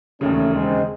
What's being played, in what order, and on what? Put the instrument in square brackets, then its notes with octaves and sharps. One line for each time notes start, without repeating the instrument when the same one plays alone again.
[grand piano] E1 D#2 C#3 [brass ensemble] A3 C#4
[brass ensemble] G#3 C4